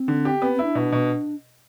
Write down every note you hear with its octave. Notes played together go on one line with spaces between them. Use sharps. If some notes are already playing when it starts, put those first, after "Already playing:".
Already playing: C4
D3
G4
B3 C4
C4
E4
D4
B2
B2